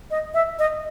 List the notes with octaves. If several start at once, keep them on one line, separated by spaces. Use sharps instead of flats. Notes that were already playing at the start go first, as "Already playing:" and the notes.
D#5
E5
D#5